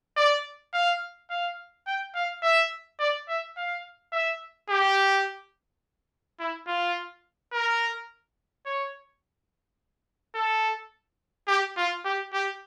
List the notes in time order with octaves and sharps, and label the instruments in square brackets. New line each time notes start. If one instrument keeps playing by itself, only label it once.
[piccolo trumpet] D5
F5
F5
G5
F5
E5
D5
E5
F5
E5
G4
E4
F4
A#4
C#5
A4
G4
F4
G4
G4